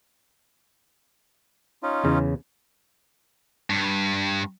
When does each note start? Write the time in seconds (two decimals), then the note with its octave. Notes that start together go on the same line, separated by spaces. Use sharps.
1.83 C#4 D#4 F4
2.04 E2 C#3
3.70 G2